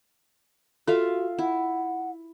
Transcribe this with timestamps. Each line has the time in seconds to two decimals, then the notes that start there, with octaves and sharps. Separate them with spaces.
0.88 F4 F#4 A4 E5 F5
1.38 E4 F#5